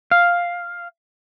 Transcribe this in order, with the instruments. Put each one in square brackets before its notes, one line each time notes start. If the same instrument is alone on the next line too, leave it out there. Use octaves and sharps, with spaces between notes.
[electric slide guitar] F5